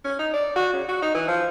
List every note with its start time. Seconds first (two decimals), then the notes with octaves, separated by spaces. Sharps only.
0.04 C#4
0.19 D#4
0.34 D5
0.56 F#4
0.73 C#3
0.88 F#4
1.02 D#4
1.14 E3
1.28 F3